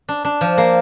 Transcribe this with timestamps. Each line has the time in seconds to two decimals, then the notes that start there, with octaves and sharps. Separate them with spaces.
0.09 D4
0.25 D4
0.41 F3
0.58 A#3